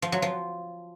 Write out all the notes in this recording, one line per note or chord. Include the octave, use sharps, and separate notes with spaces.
F3
F#3
F3